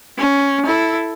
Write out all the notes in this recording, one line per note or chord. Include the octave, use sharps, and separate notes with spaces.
C#4
E4 A4